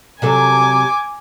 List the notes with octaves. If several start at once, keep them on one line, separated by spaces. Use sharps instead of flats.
C3 F#3 A4 G#5 D6